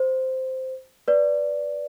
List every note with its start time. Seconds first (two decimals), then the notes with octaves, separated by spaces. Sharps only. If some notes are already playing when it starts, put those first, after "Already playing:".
Already playing: C5
1.08 B4 D5